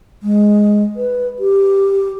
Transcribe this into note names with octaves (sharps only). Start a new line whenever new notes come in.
G#3
B4
G4